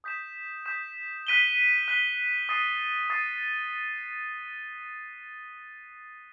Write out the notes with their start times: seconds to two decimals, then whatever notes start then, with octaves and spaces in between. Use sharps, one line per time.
0.04 D#6 G6 B6 E7
0.66 D#6 G6 B6 E7
1.27 F#6 B6 D#7 G7
1.88 F#6 B6 D#7 G7
2.49 D#6 A6 C7 D#7
3.10 D#6 A6 C7 D#7